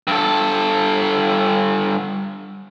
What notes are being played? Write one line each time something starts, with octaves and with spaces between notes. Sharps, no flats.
G2 A4